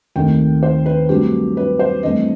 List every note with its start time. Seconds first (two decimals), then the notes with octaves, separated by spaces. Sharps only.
0.16 D#2 D#3 A3 C4 G5
0.63 C5
0.86 B4
1.09 G2 F#3 A3 C4 G4
1.57 B4
1.79 C5
2.03 G2 E3 A3 C4 D#5